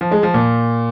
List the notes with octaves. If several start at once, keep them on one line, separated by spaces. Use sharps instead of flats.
F3
G#3
F3
A#2